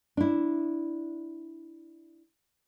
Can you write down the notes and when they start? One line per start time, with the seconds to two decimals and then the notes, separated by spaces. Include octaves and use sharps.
0.17 D4 E4